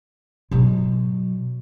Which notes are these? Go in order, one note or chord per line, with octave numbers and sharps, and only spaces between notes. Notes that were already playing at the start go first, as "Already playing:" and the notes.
B2 F#3